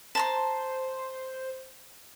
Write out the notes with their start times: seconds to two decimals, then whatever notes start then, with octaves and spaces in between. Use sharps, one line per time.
0.15 C5 A5 A#5 C6